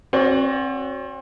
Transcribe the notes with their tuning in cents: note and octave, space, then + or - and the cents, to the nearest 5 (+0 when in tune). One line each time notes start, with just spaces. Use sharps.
C4 +35 F#4 +0 D5 -40